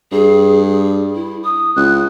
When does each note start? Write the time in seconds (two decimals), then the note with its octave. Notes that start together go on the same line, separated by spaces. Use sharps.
0.12 G2 G#4
1.15 E4
1.44 D#6
1.76 C#2 F#6